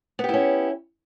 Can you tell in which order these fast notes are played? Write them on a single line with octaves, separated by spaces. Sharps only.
B3 G4 E4 C#4